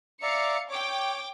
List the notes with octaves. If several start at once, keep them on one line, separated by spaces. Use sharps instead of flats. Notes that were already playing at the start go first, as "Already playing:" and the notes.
D5 E5 F5 A#5 C#7
C#5 G5 D6